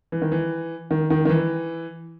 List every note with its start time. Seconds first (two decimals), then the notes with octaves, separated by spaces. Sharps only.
0.12 E3
0.22 D#3
0.32 E3
0.91 D#3
1.10 D#3
1.25 D#3
1.29 E3